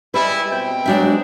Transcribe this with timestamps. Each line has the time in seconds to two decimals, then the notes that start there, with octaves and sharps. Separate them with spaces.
0.14 G3 G#3 E4 B4
0.50 B2 C4 G5
0.86 F#3 G#3 D4 E5